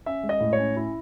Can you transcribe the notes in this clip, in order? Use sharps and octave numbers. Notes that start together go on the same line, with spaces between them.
C#4 E5
G#3
D#5
A2
C#5
C#4
E4